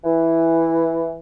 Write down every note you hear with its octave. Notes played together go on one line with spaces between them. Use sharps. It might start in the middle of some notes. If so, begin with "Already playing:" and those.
E3